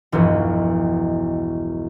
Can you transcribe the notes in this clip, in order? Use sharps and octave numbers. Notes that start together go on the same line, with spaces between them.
E1 B1 E2 G2 F3 D#5